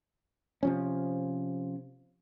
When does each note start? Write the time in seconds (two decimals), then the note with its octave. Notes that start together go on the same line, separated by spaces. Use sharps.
0.63 C3 F3 C#4